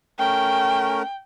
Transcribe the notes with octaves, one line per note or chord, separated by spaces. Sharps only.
A3 C#4 A#4 G5